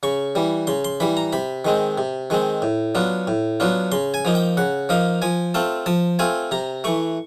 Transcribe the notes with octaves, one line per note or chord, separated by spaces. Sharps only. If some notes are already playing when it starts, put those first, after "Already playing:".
C#3 C#6
E3 G3
C#3 C6
C6
E3 G3 B5
A#5
C3 B5
D#3 G#3 C4
C3
D#3 G#3 C4
A2
F#3 B3 D4 F4
A2
F#3 B3 D4 F4
C#3 C6
G#5
F3 A#3 D#4
G5
C#3 F#5
F3 A#3 D#4 F5
F3 G#5
A3 C4 F4 A5
F3 A5
A3 C4 F4 G#5
C3 A#5
E3 A3 C#6